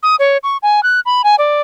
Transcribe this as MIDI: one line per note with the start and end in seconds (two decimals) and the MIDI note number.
0.03 0.16 87
0.19 0.38 73
0.43 0.57 85
0.63 0.83 80
0.83 1.00 90
1.06 1.22 83
1.24 1.36 80
1.39 1.61 74